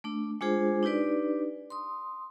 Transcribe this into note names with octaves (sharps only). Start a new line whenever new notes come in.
A3 D4
G#3 D4 F4 G#4 C5
D4 D#4 G4 B4 D5
C6 D#6